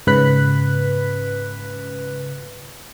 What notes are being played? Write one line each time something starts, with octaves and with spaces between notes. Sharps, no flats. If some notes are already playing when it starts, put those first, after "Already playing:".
G#2 C#3 B4 F#6 B6